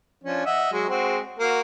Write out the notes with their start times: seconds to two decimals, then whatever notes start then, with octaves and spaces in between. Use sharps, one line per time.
0.24 F3 C#4 D4
0.46 D#5 E5 F#5
0.72 F#3 G#3
0.89 G#3 C4 F#4
1.39 A#3 F#4